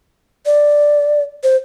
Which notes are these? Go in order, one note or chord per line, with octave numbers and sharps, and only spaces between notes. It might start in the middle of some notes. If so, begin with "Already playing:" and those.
D5
C5